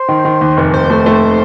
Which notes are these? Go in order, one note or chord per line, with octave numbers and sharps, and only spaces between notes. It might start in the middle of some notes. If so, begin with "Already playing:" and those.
Already playing: C5
D#3
D#3
D#2
F1
F1 C5
A3
A3